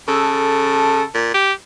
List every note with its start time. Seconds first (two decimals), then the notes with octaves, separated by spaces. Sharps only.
0.08 C#3 A4
1.14 A#2
1.34 G4